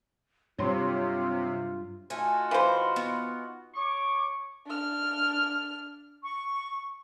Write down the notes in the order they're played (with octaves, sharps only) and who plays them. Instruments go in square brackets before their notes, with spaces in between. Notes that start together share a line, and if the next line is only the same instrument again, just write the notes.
[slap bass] G2 F#3 [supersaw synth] C3 [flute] F4 [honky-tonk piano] C#5 C6
[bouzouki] A3 G#5 [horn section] D#4 F4 F#4
[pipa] E3 C5 [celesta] F5 B5
[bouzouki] B3
[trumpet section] C#5 C#6 D6
[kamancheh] D4 F6
[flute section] C#6